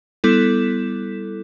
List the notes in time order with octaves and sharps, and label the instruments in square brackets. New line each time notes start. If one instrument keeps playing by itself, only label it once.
[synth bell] G3 B3 E4 A4